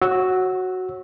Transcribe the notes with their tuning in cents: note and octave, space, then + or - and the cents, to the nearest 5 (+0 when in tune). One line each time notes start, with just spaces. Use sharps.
F#4 +0 C#5 -35 E6 -15